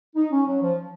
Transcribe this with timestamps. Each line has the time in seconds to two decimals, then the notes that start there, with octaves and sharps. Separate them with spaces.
0.15 D#4
0.31 C#4
0.46 F#3
0.61 F3